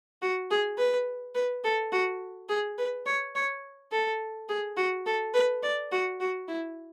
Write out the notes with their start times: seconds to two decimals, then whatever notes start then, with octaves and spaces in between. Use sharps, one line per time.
0.22 F#4
0.50 G#4
0.78 B4
1.35 B4
1.64 A4
1.92 F#4
2.49 G#4
2.78 B4
3.06 C#5
3.35 C#5
3.92 A4
4.49 G#4
4.77 F#4
5.06 A4
5.34 B4
5.63 D5
5.92 F#4
6.20 F#4
6.48 E4